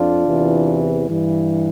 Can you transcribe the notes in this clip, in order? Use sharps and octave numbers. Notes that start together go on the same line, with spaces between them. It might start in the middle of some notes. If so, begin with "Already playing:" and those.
Already playing: F2 D4 F4
E2 C3 E3
G2 E3